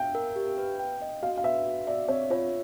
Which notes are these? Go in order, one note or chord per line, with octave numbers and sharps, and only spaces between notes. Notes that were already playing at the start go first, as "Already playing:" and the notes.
Already playing: E5 F5 G5
A#4
G4
B4
G5
D#5
F#4 F5
F5
B4 E5
F#4
D5 E5
C4 C#5
F4 C#5